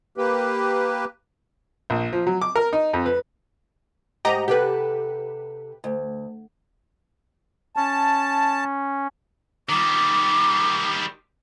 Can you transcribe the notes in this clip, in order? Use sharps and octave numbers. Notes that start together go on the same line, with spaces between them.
A#3 G4 B4
A#1
F3
F#3
D6
A#4
D#4
F2
B4
G#2 G4 D#5 F#5 A#5
C3 G4 A4 B4
D2
C#4 A5
D#3 G3 D6